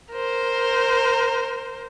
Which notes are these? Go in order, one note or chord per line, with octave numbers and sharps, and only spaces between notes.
A#4 C5